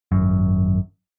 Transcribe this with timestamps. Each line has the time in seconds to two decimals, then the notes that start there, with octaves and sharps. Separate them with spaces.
0.12 G#1 F#2